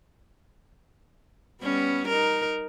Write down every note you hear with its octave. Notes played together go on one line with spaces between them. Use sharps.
G3 B3 C#4
D#4 A#4